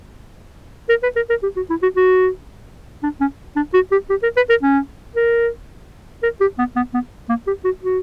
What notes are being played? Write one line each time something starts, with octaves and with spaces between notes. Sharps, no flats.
A#4
B4
A#4
A#4
G4
F#4
E4
F#4
F#4
D4
C#4
D4
F#4
G4
G4
A#4
B4
A#4
C#4
A#4
A#4
G4
B3
B3
B3
A#3
G4
F#4
F#4